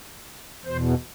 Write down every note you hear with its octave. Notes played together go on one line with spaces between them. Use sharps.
E2 B2 C5